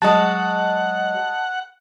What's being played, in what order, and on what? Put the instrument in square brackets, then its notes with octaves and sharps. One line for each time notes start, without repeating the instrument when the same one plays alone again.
[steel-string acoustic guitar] F#3 G#3 F#4 [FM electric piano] D#5 A5 [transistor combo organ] F#5